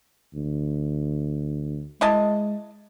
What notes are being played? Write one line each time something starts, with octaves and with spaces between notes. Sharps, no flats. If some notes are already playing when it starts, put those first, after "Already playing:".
D2
G#3 E4 D#5 A5